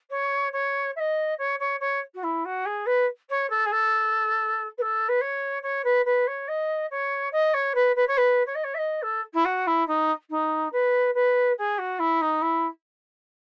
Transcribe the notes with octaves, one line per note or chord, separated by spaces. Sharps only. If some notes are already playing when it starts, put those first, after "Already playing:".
C#5
C#5
E5
D#5
C#5
C#5
C#5
F#4
E4
F#4
G#4
B4
C#5
A4
G#4
A4
B4
A4
B4
C#5
C#5
B4
B4
C#5
D#5
C#5
D#5
C#5
B4
B4
C#5
B4
C#5
D#5
C#5
E5
D#5
A4
E4
F#4
E4
D#4
D#4
B4
B4
G#4
F#4
E4
D#4
E4